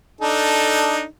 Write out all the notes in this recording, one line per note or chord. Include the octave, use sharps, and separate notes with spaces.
D4 D#4 A4